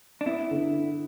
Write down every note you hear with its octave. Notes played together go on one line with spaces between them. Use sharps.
D4
B3 E4
D3